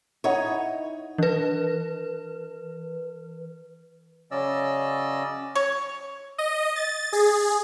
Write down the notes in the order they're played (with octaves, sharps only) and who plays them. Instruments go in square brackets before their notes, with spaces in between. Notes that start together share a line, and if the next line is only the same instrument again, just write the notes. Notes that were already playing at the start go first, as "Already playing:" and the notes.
[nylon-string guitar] D#4 C#5 [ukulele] E4 D#5 F#5
[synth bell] E3 B4
[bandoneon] C#3 F#3 C#4 D5 D#5 E6
[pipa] C#5
[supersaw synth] D#5
A6
G#4